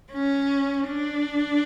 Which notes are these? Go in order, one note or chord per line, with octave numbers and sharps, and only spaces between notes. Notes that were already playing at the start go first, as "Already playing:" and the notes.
C#4
D4